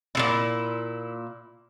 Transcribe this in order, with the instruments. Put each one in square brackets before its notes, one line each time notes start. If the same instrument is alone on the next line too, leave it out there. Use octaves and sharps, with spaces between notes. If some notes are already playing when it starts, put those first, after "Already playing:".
[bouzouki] A#2 C#3 E4